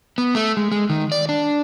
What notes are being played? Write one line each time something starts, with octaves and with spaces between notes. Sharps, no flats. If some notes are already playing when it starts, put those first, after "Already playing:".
B3
A3
G#3
G#3
D#3
D5
D4